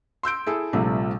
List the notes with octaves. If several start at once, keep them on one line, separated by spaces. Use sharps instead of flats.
C6 E6 G6 D7
E4 G#4 A4
A#1 C3 F3 G3 A3